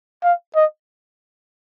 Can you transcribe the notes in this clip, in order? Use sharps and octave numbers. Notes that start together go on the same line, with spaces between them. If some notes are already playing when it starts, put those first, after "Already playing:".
F5
D#5